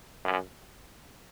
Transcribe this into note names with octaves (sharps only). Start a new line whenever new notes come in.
F#2